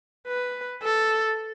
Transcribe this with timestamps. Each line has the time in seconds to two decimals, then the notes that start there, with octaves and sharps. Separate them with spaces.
0.27 B4
0.82 A4